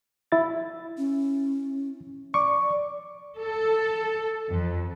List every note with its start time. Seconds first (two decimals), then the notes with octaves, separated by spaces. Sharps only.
0.32 E4 A6
0.98 C#4
2.34 D5 C#6 D6
3.38 A4
4.50 F2